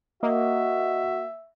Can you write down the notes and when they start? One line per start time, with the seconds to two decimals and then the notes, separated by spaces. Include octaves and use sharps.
0.23 A#3 F#4 D#5 E5